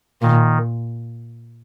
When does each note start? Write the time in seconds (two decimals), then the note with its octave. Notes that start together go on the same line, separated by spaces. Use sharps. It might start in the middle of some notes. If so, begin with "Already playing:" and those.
0.22 A#2 D#3